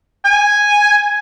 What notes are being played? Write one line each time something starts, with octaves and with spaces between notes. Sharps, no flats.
G#5